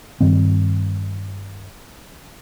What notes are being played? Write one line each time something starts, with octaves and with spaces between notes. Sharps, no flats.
G2 D#3 C4